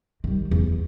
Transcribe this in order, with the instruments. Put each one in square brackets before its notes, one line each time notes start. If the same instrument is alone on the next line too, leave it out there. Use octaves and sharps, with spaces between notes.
[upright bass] D#3 G3
E2